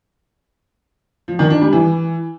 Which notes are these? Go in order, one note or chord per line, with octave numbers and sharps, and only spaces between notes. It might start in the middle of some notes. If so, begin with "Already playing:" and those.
F3
D#3
D4
G3
E3